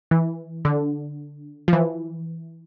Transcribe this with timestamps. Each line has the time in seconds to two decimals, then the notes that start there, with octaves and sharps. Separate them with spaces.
0.11 E3
0.65 D3
1.68 F3
1.73 E3